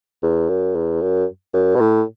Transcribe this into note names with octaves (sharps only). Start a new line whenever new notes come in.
E2
F#2
E2
F#2
F#2
B2
A2